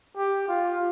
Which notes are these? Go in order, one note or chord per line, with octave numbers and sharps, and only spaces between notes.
G4
F4